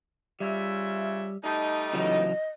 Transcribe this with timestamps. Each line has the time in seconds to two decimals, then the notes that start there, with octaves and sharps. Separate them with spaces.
0.40 C#3 G3 F4 E5
1.44 G3 A3 D#4 A5
1.93 C#3 E3 F#3 D#5